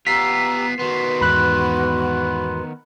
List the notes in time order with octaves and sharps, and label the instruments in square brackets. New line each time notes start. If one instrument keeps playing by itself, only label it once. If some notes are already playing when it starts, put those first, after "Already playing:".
[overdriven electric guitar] B3 F4 [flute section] G4 A#5 E6 [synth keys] B6 C7
[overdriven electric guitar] D#3 B3 [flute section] F#4 B4 C6
[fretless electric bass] E2 G#2 [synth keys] B5 F#6